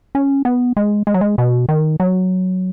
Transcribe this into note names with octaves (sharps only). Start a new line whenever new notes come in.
C#4
B3
G#3
G#3
F#3
G#3
B2
D#3
F#3